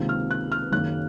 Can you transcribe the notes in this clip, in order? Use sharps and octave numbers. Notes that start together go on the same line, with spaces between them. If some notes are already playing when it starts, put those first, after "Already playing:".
Already playing: C#2 C3 D#3 A#3
F6
F#6
F6
F#1 F#2 D#3 A#3 F#6